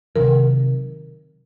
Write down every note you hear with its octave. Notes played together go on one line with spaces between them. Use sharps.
C3 D#3 F#3 A#4